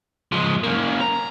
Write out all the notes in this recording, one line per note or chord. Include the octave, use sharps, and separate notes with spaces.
F3 G#3
A#3 C#4
A#5